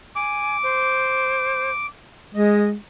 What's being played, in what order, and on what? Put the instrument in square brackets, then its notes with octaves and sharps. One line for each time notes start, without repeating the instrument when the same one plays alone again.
[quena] G#5 [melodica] D6
[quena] C5
[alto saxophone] G#3 [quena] D#5